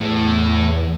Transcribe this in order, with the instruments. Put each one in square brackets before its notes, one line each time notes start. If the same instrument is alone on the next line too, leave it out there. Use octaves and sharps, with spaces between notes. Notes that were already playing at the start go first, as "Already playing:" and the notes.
[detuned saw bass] E2 [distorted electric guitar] A2